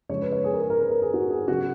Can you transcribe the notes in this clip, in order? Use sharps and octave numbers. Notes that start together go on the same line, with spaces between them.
C#3 F3 G#3 C#5
B4
C#5
G#4
A#4
G#4
A#4
B4
A#4
G#4
F#4
G#4
C#3 F#3 F#4